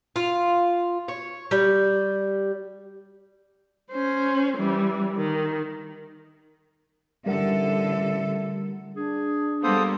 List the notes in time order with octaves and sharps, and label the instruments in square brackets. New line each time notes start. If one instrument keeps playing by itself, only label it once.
[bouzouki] F4
C#5
G3
[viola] C#4 C5
E3 G3
D#3
[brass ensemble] A1 E5 [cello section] D3 A4 [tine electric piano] G3 A#4 F#5
[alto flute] D4 [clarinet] G#4
[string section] G3 A#3 B3 [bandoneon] A4 C5 D#6 [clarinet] F5